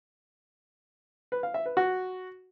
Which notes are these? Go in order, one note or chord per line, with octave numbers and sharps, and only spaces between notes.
B4
F5
E5
B4
F#4